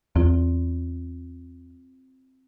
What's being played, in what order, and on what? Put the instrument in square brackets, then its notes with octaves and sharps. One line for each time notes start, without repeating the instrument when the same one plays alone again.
[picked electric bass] E2 [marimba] C4 F4